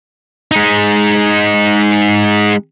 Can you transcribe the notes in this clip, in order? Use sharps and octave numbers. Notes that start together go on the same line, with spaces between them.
G#3 D#4